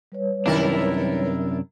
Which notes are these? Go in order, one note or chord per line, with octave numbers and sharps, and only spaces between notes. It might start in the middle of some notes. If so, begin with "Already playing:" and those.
G3 B4 C#5
F#2 C3 D#3 D4 E4 A#4